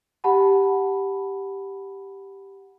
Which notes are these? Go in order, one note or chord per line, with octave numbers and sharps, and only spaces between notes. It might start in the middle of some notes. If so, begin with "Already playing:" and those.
G4 F#5 A5 B5